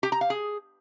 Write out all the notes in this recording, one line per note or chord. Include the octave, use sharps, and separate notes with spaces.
G4
A#5
F5
G#4